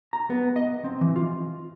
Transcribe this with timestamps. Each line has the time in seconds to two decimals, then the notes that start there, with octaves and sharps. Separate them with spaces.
0.13 A#5
0.30 B3
0.56 D#5
0.84 C4
1.01 E3
1.16 F4